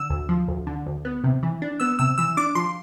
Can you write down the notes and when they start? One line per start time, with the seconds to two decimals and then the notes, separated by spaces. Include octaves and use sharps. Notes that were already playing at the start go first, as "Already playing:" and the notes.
Already playing: D3 E6
0.10 D2
0.29 F3
0.48 D2
0.67 D3
0.86 D2
1.05 B3
1.24 C3
1.43 E3
1.62 D4
1.80 B3 E6
1.99 C3 E6
2.18 E3 E6
2.37 D4 D6
2.55 F3 C6